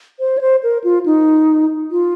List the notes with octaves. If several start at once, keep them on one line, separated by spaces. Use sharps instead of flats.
C5
C#5
C5
A#4
F4
D#4
F4